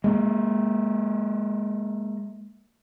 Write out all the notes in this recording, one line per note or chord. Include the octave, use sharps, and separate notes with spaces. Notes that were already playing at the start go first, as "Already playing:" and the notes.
G#3 A#3